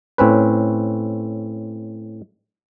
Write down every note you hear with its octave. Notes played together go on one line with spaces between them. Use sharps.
A2 C4 C#4 B4